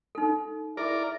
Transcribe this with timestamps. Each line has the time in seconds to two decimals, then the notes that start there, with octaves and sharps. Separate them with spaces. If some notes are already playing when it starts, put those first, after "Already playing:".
0.15 D#4 A4
0.77 E4 G#4 A#4 D5